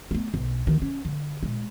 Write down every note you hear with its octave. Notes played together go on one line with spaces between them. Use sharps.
A3 B3
B1
D2 D#3
C#4
D3
A#2 G#3